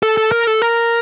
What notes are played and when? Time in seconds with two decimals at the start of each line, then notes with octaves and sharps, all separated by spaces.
0.03 A4
0.17 A4
0.32 A#4
0.47 A4
0.62 A#4